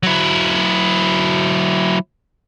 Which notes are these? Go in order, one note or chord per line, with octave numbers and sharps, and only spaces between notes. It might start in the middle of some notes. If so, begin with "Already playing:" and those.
F#3 E4